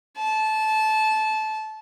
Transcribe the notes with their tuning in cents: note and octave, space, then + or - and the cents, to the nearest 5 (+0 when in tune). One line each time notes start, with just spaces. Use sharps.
A5 -20